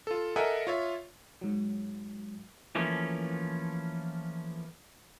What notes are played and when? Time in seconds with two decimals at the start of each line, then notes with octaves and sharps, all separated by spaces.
0.07 F4 A4
0.36 A4 A#4 D#5 E5 F#5 G#5
0.67 F4 C#5 E5
1.41 G#2 F#3
2.75 E3 F3 A3 A#3 C#4